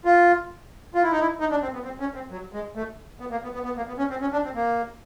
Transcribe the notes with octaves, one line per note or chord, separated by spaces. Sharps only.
F4
F4
E4
D#4
E4
D#4
D4
C4
B3
C4
C#4
C4
F#3
G#3
A3
B3
A#3
B3
B3
B3
A#3
B3
C#4
C4
C#4
D4
C4
A#3